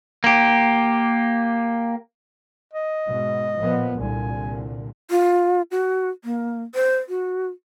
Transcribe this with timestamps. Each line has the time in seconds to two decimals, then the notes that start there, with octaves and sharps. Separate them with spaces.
0.24 A#3 G4
2.73 D#5
3.08 G#2 B2
3.59 A#2 F3 B3
3.99 C2 A#2 D3 G#5
5.10 F4
5.71 F#4
6.25 A#3
6.75 C5
7.09 F#4